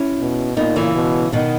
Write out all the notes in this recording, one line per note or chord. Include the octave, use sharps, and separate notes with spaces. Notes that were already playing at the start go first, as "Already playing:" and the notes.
Already playing: C#4 E4
B2
A#2 B3 D#4
C#3 E3
B2
B2 D#3